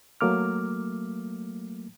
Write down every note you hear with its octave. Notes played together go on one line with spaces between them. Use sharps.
F#3 A3 A#3 D6 F6